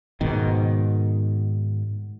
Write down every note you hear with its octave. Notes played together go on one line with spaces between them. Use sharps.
G#2 B2 D#3